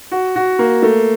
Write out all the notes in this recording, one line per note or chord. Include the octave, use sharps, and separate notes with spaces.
F#4
F#4
A#3
A3